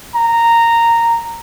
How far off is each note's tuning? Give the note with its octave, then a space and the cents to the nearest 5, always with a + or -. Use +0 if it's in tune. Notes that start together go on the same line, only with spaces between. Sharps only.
A#5 -10